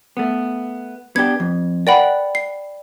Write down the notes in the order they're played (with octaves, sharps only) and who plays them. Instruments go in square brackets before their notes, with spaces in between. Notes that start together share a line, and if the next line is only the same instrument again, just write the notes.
[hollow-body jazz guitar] A3 B3
[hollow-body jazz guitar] B3 D4 G4 [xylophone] G#6
[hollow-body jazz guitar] F2
[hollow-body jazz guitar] A#4 B4 F#5 [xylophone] D5 G5 B5
[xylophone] C7